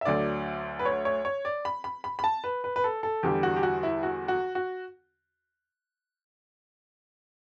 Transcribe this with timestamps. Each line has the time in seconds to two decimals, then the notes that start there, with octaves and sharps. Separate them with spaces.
0.01 E5
0.05 D2 D3 F#3 D5
0.79 B4
0.85 C#5
1.05 C#5
1.25 C#5
1.45 D5
1.65 B5
1.84 B5
2.04 B5
2.19 B5
2.24 A5
2.44 B4
2.64 B4
2.76 B4
2.84 A4
3.03 A4
3.23 E2 D3 G3 G4
3.43 F#4
3.56 G4
3.63 F#4
3.83 E4
4.03 F#4
4.28 F#4
4.55 F#4